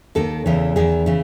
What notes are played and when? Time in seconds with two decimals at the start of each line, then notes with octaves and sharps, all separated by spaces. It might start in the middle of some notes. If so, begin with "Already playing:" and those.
0.15 D#2 D#3 A4
0.46 E2 C#3 E3
0.76 E2 D#3 G#4
1.06 C#3 E3